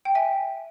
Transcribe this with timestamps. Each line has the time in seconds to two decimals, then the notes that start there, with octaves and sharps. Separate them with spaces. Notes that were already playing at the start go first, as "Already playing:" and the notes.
0.05 G5
0.15 E5 G#5